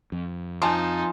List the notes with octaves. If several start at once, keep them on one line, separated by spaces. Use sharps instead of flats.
F2
F3 D#4 G#5 A5 C6